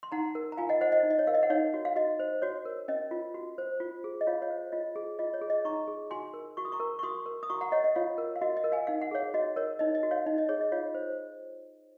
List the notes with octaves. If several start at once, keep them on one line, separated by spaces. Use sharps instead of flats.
C6
D#4 F#5 A#5
A#4
A#5
F4 F5 G#5
D#5 F#5
C5 D#5 F#5
D#5
D#4
D#5
C#5
A#4 F5
D#5
F#5
D#4 C#5 F5
F#4
F5
F#4 D#5
C5
F#4 C#5
A#4
C#4 D#5
F4
F#4
C5
F4
G#4
D#5
F4 C#5 F5
C#5 F5
C5
F4 D#5
G#4
F4 D#5
C#5
G#4
D#5
D#4 A#5 C#6
G#4
F#4 G#5 C6
A#4
F#4 C#6
D#6
A#5 C#6
A#4
C#6
F#4 C6 D#6
A#4
D#6
F#4 A#5 C#6
F#5 A#5
C#5 D#5 F#5
D#5
F4 C#5 F5
A#4
F5
F#4 D#5
D#5
A#4
F5 G#5
D#4 F5
F#5
G#4 C#5 F5
F#4 D#5
A#4 C#5
D#4 D#5
D#5
F#4
C#5 F5
D#4 D#5
D#5
G#4 C#5
D#5
F4 C#5 F5
C5